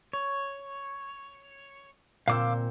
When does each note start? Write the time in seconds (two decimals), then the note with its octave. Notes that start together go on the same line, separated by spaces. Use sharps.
0.13 C#5
2.28 A#2 C4 F5 D6 E6